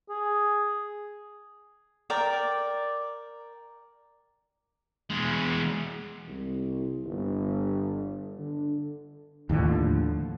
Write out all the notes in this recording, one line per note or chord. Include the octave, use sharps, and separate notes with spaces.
G#4
A#4 D5 G5
E2 G#3
C2
G1
D3
D#2 A2 D3 F3